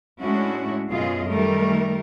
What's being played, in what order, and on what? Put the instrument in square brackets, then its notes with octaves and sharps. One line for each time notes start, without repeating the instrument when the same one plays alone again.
[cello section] A2 G#3 C#4 D4 E4 F#4
F#2 B2 F4 G#4 D#5
D#3 G3 A3 A#4